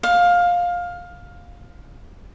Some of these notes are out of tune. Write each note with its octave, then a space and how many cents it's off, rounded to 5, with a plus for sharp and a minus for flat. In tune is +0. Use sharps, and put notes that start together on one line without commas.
F5 +15